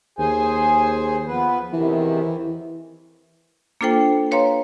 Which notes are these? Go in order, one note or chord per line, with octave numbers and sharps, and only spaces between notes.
D#2 G#4 C5 G#5
F3 B3 B4
E2 C3 D#3 E3
A#3 D4 F4 A4 C5 G5
B4 C#5 F5 A#5 C6